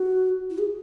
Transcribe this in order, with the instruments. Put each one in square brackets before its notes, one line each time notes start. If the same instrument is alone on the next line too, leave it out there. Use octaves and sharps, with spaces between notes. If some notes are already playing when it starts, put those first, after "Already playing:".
Already playing: [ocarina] F#4
E4
G#4